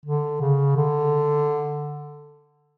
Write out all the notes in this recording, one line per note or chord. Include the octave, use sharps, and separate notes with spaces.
D3
C#3
D3